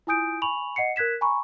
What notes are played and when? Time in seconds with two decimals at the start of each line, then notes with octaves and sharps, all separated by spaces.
0.07 E4 F4 G#5 D#6 G6 D7
0.42 G#5 B5 C#6 F7 F#7
0.76 D#5 F#5 C7 C#7
0.96 A#4 F#6 G#6 B6 E7
1.21 G#5 A#5 B5 C#6